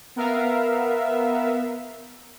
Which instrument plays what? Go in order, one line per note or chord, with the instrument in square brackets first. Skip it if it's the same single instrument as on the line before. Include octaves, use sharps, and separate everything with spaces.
[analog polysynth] B3 A#4 E5 F5